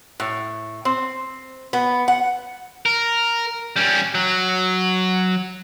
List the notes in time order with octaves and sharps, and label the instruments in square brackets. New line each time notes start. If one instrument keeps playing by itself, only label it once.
[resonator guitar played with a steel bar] A2
C4
B3
F#5
[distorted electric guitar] A#4
G3 C#4
F#3